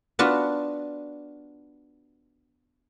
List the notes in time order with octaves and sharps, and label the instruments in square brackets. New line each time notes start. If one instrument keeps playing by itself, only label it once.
[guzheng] B3 D4 F4 F#4